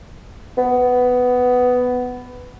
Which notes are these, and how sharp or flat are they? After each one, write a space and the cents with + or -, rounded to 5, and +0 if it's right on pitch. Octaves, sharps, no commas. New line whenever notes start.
B3 +10